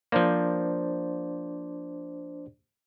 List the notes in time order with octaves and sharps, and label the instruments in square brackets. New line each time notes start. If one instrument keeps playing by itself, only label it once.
[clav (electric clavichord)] F3 A#3 [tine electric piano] D4 C5 D5